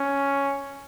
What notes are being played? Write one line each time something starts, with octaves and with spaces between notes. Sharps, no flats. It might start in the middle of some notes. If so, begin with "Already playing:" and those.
Already playing: C#4